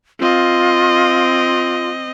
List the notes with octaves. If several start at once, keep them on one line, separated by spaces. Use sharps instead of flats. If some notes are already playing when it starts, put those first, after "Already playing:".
C4 F4 D#5